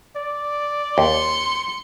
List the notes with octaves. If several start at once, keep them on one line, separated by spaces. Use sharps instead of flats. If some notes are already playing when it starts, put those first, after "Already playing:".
D5
D#2 C6 C#7